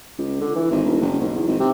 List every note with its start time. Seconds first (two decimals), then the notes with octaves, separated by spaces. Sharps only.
0.19 C#2
0.41 D3
0.56 E3
0.71 G#1
0.84 E1
1.01 F#1
1.20 B1
1.36 E2
1.47 G#1
1.60 C3